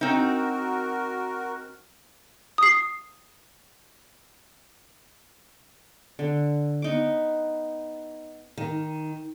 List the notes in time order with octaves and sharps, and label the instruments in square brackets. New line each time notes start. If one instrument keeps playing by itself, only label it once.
[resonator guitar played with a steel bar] C4 D#4 [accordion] F#4 A#4
[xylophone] D#6 C7
[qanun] D3
B3 D#4 D6
[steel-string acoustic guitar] D#3